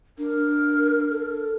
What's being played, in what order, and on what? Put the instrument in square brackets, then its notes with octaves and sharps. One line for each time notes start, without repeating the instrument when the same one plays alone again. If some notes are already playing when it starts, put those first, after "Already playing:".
[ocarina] D4 [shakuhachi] A#4
[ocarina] A4